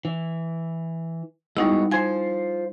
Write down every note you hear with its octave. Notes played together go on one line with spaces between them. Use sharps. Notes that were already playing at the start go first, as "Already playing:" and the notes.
E3
G3 G#3 B3 D#4 E4 F#4
F4 C5 G#5 G#6